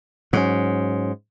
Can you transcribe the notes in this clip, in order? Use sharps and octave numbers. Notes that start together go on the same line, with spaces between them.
G#2 F#3 C#4